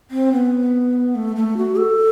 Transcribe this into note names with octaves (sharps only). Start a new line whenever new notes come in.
C4
B3
A3
A3
F#4
A4